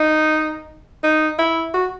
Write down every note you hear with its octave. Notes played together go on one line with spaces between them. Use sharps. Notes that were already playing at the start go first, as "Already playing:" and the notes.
Already playing: D#4
D#4
E4
F#4